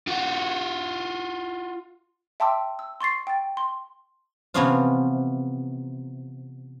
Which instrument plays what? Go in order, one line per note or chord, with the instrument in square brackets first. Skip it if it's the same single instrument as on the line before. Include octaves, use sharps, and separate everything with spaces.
[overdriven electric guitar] F4 F#4
[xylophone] E5 G5 A5 C6 D6 E6
E6
C6 C#6 A6 C7
G5 A6
C6
[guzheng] C3 E3 F3 B3 C#4 F4